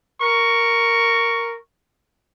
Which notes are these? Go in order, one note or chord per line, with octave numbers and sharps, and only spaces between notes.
A#4 C#6